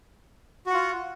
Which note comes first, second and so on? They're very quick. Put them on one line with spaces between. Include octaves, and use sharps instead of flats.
F#4 F#5 F4